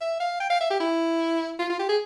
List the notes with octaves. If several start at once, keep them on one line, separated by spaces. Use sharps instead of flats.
E5
F5
G5
F5
E5
G4
E4
F4
F4
G4
G#4